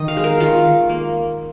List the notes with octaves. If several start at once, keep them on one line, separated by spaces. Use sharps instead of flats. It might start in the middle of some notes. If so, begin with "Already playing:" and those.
Already playing: D#3 D#5
F5
G#3
A#4
D#3 F4
D#3
A#3